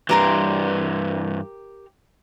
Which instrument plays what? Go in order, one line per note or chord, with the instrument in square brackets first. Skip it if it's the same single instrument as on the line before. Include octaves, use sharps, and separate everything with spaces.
[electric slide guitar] G2 E3 [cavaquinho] G4 A#4 C6